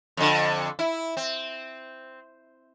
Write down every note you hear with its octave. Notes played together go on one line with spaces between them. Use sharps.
F2 D3
E4
C4